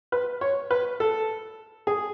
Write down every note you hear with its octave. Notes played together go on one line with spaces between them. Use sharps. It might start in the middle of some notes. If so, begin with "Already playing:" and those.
B4
C#5
B4
A4
G#4